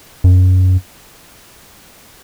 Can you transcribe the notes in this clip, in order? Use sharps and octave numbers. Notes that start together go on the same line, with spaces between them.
F#2